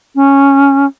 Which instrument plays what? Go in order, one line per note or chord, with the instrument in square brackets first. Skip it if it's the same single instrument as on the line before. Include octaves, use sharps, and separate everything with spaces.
[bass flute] C#4